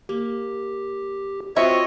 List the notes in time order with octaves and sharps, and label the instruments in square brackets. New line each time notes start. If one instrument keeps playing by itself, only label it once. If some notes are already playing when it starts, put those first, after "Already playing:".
[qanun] A#3 [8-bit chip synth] G4
[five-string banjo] C4 E5 [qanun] F4 F#4 C#6 [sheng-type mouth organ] C#5 D#5